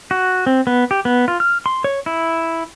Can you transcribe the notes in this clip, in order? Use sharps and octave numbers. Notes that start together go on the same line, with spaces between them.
F#4
C4
B3
G4
B3
F4
F6
C6
C#5
E4